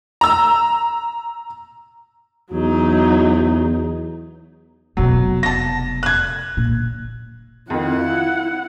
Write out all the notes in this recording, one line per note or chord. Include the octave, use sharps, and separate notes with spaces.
A#5 E6
E2 F#3 D#4
F1 B2 F#3
A5 A#6
F#6 G#6
A#2
F2 D#3 E4 F#5
F4